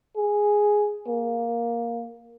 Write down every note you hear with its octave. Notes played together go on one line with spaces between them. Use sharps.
G#4
A#3